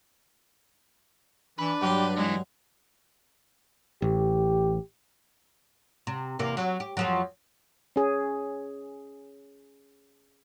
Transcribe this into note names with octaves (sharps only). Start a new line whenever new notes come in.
E3 D4 B4
G2 F#3 G4 C6
G#2 E3 G#3
A1 G4
C3
E2 C3 A#3
F#3
G4
F2 F3 F#3
C#4 G#4